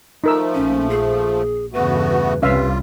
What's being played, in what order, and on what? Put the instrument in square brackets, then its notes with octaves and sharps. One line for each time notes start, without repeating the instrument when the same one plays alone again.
[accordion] F3 A3 [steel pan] D#4 A#4 E6
[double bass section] A#1 [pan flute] C#4
[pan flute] G#4
[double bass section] E2 G2 C#3 [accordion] A3 B3 F#4 [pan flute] B4
[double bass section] C2 C3 G3 [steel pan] C#4 E5 F5 [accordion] F4 [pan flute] B4